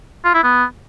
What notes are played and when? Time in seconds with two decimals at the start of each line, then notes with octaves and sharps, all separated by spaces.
0.25 F4
0.34 E4
0.43 B3